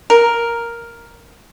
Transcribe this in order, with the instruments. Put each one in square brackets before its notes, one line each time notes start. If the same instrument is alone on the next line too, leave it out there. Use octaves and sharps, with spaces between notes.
[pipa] A#4